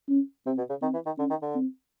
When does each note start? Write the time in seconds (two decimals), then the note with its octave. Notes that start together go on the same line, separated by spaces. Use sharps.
0.09 C#4
0.46 C3 C4
0.58 B2
0.69 C#3
0.82 D#3 C4
0.94 E3
1.06 D#3
1.18 D3 C#4
1.30 D#3
1.42 D3
1.55 C4